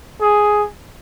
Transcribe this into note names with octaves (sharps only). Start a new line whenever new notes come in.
G#4